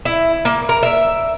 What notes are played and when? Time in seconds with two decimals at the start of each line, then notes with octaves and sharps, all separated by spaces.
0.05 E4
0.45 A#3
0.69 A#4
0.83 E5